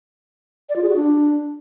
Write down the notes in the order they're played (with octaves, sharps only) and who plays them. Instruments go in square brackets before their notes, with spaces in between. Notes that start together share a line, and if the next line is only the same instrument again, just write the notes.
[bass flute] D5
F4
G#4
F#4
D4